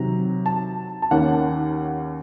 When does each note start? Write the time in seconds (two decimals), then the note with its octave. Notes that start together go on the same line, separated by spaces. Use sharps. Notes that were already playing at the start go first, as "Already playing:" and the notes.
Already playing: C3 D#3 F#3 A#5
0.46 A5
1.02 A5
1.11 D#2 D#3 A#3 C#4 F#5